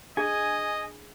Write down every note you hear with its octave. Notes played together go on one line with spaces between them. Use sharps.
D4 G#4 D#5 G#5